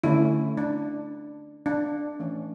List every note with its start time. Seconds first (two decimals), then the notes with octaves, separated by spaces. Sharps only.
0.04 D3 A3 C#4 E4
0.57 D4
1.66 D4
2.20 E3 A3 C#4